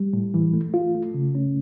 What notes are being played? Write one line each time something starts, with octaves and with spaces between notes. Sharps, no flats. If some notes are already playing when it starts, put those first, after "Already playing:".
Already playing: G3
A2
E3
A3
F4
A3
C#3
C#4